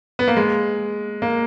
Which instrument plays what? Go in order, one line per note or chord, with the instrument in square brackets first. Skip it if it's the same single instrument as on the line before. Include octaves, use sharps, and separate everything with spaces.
[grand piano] B3
A#3
G#3
A#3